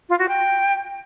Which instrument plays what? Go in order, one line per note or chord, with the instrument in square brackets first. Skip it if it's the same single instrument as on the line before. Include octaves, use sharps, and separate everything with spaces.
[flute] F4
F#4
G5